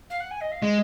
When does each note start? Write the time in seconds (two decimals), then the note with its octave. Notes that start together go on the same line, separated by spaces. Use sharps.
0.10 F5
0.20 F#5
0.31 G#5
0.41 D#5
0.52 F5
0.62 G#3 D#5